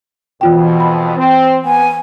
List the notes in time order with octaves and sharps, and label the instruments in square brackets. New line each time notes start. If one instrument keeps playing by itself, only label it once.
[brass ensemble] F2 B2 [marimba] E3 F4 G5
[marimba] B5
[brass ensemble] C4
[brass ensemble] B3 [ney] G#5